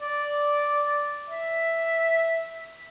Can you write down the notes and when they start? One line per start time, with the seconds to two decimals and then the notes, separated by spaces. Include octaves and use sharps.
0.01 D5
1.30 E5